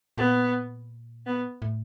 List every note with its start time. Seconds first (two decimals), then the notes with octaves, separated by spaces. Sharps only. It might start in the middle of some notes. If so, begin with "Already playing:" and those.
0.18 A#2 B3
1.26 B3
1.62 A2